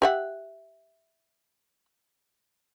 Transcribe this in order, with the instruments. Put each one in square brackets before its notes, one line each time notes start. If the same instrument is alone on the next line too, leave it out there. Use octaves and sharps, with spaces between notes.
[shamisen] G4 E5 F#5